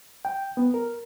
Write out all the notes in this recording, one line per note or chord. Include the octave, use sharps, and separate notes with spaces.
G5
B3
A#4